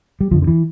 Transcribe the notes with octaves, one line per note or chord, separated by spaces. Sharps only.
G3
F2 D3 F3
D3
E3